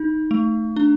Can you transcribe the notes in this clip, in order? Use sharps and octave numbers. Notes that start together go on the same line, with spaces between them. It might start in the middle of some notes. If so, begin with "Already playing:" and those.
Already playing: D#4
A3
D4